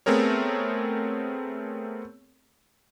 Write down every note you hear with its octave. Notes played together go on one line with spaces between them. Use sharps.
A3 B3 C4 G#4 A#4 C#5